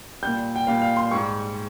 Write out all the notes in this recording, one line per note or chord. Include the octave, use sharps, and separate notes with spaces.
A#2 G3 G6
G5
A#2 G3 F5
F5
C6
G#2 G3 C#6